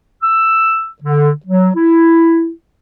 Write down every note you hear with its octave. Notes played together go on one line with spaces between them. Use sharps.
E6
D3
F#3
E4